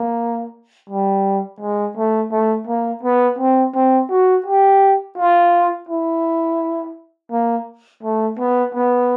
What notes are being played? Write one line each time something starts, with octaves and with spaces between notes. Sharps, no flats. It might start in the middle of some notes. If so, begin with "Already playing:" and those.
Already playing: A#3
G3
G#3
A3
A3
A#3
B3
C4
C4
F#4
G4
F4
E4
A#3
A3
B3
B3